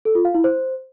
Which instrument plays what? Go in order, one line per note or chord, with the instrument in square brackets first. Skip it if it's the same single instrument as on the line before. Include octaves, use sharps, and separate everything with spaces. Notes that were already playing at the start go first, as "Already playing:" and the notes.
[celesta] A4
F4
F5
E4
C5